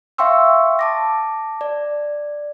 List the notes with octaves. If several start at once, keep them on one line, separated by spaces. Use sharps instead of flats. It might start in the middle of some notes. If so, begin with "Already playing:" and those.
E5 F5 G5 C6 C#6 E6
A5 D6 A#6
D5